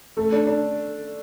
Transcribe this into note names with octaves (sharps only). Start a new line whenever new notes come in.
A3
D4
D4